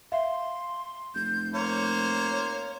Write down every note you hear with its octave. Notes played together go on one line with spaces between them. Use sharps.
E5 F5 C6
F1 G6
A#3 C5 C#5